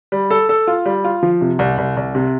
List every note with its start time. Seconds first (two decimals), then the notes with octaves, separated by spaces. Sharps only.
0.12 G3
0.30 A4
0.49 A4
0.67 F4
0.86 G3
1.04 F4
1.23 F3
1.41 C3
1.59 C2
1.78 C2
1.97 C2
2.15 C3